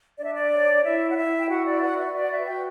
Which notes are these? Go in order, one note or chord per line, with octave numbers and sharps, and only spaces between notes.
D4 D5
E5
D5
C#5
E4 E5
F#5
E4 E5
G5
F#4 F#5
D5
E5
B4 F#5
D5
E5
F#4 D5
F#5
E5
F#4 G5